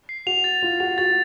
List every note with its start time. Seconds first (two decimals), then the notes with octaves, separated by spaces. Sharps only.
0.09 C7
0.26 F#4 F7
0.44 A6
0.62 F4 F7
0.80 F#4 F7
0.98 F#4 A6